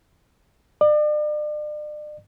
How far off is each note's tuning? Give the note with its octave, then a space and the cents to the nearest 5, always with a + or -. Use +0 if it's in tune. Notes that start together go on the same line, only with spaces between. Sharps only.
D5 +40